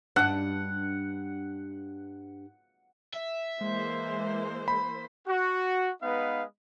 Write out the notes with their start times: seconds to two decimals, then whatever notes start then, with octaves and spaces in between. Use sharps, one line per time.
0.16 G2 D4 F#5
3.13 E5
3.61 E3 G#3 A#3 C5
4.68 B5
5.28 F#4
6.03 G#3 B3 D#4 B4 D#5 F5